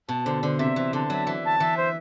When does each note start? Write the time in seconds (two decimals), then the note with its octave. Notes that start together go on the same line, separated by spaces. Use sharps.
0.09 B2 A5
0.25 D3 C5
0.43 D3 C5
0.59 C3 E5
0.76 E3 C5
0.93 D3 A5
1.10 F#3 E5
1.27 E3 E5
1.44 A5
1.60 E3 E5
1.77 C5